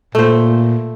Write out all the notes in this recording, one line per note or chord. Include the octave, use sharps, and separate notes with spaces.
A#2 A3 C5